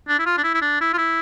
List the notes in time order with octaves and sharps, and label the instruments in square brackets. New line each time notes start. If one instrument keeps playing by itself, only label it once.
[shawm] D4
E4
F4
D4
E4
E4
D4
E4
F4
E4